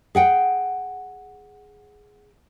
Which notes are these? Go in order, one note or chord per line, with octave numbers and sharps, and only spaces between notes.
G#4 F#5 G5